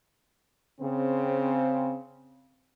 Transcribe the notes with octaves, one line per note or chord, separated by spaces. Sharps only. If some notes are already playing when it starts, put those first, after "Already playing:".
C#3 C4